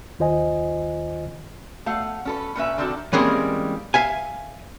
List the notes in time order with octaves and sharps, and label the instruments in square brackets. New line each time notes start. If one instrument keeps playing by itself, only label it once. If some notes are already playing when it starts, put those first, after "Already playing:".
[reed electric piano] D#2 D#3 F4 C5 D#5 G#5
[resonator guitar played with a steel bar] A3 F5 F#5
C#4 A4 B4
A#2 C#4 B4 E5
D3 D#3 C4 D4 F#4 A4
[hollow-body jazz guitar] E3 G3 G#3 A#3 C4 C#4
E5 F5 G#5